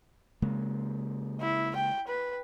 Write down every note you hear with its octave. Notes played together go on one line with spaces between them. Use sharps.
C#3 G#3 A#3
E4
G5
B4